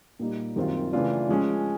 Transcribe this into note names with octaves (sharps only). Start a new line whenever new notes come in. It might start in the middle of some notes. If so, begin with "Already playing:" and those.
A#2 G3 A#3 D#4
F#2 D#3 G3 C4 F4
C#3 E3 A3 D4 F4
F3 G#3 C#4